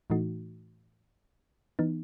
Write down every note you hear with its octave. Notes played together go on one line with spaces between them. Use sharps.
A2 E3 A3 D#4 F#4
E3 B3 D#4